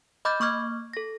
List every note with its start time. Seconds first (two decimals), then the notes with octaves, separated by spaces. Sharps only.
0.25 D#5 B5 D6 F6 G6 A6
0.40 A#3 C#6 D6 F6 G#6
0.93 A4 A#6